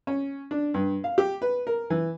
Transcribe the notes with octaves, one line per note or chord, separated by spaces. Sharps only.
C#4
D4
G2
F5
G4
B4
A#4
E3